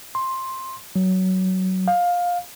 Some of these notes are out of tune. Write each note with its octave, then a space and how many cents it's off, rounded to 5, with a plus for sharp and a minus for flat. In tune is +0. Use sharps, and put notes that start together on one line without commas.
C6 +10
F#3 +15
F5 +15